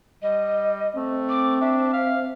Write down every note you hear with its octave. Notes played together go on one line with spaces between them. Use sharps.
G3 D#5
A3 C4
D6
D4 E5
F5